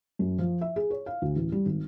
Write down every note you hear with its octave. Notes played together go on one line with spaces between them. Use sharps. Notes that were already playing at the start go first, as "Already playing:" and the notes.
F#2
F3
E5
G#4
C#5
F5
D2
A1
G3
G#1